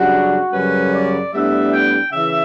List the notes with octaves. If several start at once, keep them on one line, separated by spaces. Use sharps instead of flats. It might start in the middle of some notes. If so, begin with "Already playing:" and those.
Already playing: F#2 C#3 G3 D4 F#4
F#2 C#3 G3 C#4 B4
D5
A2 G3 B3 D4 E5
G5
C#3 E3 E5